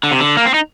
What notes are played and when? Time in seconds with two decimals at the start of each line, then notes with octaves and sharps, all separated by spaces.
0.03 D3
0.11 C3
0.20 D3
0.37 A#3
0.46 C4
0.54 D#4